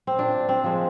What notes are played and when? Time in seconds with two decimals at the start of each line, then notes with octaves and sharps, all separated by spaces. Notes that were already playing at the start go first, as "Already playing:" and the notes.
0.07 C4
0.19 A#2 D4
0.49 C4
0.64 F3 G#3